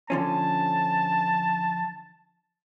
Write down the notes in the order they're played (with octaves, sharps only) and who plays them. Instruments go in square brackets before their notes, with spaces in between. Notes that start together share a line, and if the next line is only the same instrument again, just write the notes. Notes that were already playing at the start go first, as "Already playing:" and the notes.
[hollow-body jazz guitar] D3 F3 C#4 [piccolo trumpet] A5